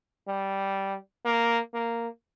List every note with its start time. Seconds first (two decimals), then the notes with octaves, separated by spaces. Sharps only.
0.28 G3
1.25 A#3
1.74 A#3